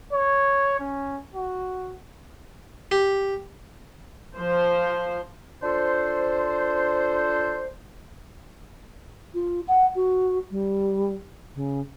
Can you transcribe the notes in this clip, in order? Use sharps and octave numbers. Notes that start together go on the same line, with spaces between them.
C#5
C#4
F#4
G4
F3 C5
D4 F4 A4 C5
F4
F#5
F#4
G3
C#3